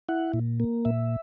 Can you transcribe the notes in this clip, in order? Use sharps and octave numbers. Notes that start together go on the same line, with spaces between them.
E4 F#5
A#2
A#3
A#2 E5